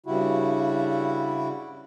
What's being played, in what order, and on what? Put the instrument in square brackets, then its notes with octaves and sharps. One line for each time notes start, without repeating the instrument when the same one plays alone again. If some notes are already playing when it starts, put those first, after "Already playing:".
[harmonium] G2 C#3 G3 E4 F#4